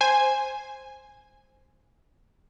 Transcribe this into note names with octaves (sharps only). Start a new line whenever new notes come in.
C5 G#5